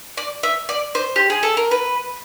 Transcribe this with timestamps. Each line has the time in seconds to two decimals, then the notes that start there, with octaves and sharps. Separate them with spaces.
0.17 D5
0.43 E5
0.69 D5
0.95 C5
1.16 G4
1.30 G#4
1.43 A4
1.57 A#4
1.71 B4